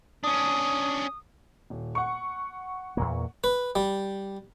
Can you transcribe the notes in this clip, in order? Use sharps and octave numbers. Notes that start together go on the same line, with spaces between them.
C#4 D4 D#6
D#1
F#5 C#6
E2 A#2 A#3
B4
G3